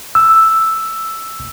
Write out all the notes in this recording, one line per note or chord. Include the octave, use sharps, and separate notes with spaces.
E6